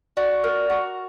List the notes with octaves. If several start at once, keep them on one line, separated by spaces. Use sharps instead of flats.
F#4 D5
A#4
F#4